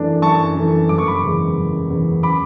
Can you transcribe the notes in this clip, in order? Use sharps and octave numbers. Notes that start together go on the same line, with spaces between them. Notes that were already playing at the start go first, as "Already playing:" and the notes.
Already playing: F#2 E3 A3 D4 D5
F#2 A5 C#6
E3 A3 D4
F#1 D6
C#6
B5 D6
E2 C#3 G#3
F#1
E2 C#3 G#3
B5 D6